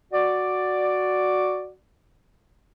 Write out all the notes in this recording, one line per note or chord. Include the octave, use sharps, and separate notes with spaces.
F#4 D5